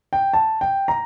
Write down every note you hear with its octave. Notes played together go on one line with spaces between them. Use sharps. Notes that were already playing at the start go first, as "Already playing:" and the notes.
G5
A5
G5
A#5